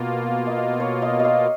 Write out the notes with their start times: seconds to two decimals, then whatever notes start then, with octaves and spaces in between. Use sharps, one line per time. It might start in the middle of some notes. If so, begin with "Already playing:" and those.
Already playing: B2 A#3 F4
0.47 D#5
0.57 F5
0.80 C#5
1.02 D#5
1.20 D#5
1.25 F5